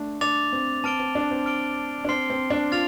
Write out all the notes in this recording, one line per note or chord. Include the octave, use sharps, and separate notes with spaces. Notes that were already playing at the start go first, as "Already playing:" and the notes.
Already playing: A3 D4
D4 D6 A6 F7
C4
C4 A5 F6 D7 G7
C4
D4
C4
F6 D7 G7
D4
C4 C6 F6 C7 G7
C4
D4
F4 F6 A6 F7